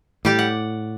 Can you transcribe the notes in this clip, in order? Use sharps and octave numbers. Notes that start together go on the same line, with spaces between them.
A2 G3 G4 D5
F#5